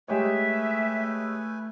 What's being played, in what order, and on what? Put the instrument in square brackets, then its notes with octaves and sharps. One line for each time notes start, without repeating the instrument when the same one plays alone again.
[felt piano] G#3 G4 C#5 [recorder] A3 [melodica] B4 G#5 [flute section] E5